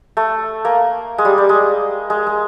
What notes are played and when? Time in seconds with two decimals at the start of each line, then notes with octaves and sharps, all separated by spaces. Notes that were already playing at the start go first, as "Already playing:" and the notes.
0.17 A3
0.65 A#3
1.18 G#3
1.25 G3
1.38 G3
1.49 G#3
2.10 G#3
2.27 G#3